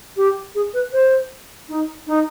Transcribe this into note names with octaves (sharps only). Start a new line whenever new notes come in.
G4
G#4
B4
C5
D#4
D#4